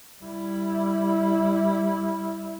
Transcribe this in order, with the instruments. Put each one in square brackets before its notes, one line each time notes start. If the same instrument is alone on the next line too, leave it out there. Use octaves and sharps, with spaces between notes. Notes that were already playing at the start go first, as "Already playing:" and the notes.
[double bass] G3 E4